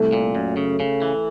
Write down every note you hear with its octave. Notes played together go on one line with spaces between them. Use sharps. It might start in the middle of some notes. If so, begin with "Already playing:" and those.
Already playing: C2 A3
A#2
F#2
C#3
C#3
E3